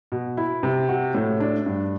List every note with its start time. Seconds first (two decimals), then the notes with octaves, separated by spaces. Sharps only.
0.12 B2
0.37 E4
0.63 C3
0.89 F#4
1.15 A2
1.40 D4
1.66 G2